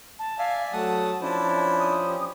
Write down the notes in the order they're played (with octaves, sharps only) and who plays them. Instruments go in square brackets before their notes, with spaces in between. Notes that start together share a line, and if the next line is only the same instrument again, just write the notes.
[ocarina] A5
[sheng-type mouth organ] D5 E5 G#5 [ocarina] F5
[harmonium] F#3 [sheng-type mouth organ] A3 F#5 D#6 [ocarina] A5
[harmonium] F3 C#4 C5 [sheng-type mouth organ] D4 E4
[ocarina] D#6
[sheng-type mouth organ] G4